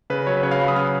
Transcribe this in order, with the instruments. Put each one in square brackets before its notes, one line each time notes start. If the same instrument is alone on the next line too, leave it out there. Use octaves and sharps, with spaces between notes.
[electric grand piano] C#3 B4
F#3 C#5
B4
C#3 C#5
F5
F#3 B5
D#6
C#3 F6